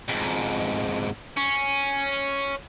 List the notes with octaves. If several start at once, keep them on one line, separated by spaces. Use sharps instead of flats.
F2 G#2
C#4